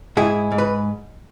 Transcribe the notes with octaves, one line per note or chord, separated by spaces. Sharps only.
G#2 E4 G#4
G#2
B4